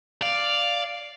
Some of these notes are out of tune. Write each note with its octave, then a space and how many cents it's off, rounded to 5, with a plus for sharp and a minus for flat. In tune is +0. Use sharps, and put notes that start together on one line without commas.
D5 +0 F5 +0